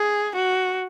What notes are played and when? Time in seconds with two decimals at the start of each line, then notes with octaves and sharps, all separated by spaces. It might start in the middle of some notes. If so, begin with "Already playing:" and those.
Already playing: G#4
0.36 F#4